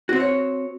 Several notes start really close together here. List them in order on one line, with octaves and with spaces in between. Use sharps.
F#4 C4 C5 C#5